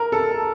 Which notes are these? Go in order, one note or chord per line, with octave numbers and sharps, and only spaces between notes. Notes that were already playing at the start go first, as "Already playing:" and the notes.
Already playing: A#4
A4